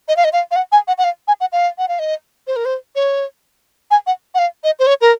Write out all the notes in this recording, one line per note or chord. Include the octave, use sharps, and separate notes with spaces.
D#5
F5
D#5
F5
F5
F#5
G#5
F#5
F#5
F5
G#5
F#5
F5
F#5
F5
D#5
C5
A#4
C5
C#5
G#5
F#5
F#5
F5
D#5
C5
C#5
A#4